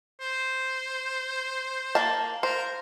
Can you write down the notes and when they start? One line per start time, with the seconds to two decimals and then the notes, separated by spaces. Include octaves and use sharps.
0.21 C5
1.95 A#3 A5
2.43 A#4 C5